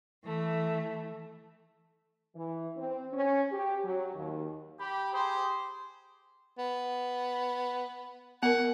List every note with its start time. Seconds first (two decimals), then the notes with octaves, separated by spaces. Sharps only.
0.23 E3 A3
2.34 E3
2.76 C4
3.11 C#4
3.52 G4
3.84 F#3
4.14 D#2
4.80 G4 B5
5.14 G4 G#4 C5
6.58 B3
8.43 B3 A#4 F#5